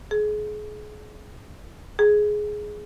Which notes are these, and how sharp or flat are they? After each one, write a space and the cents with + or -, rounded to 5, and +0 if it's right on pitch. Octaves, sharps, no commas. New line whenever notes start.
G#4 +30
G#4 +10